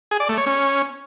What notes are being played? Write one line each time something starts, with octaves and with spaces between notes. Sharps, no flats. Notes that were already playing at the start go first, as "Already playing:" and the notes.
G#4
D5
A3
C#5
C#4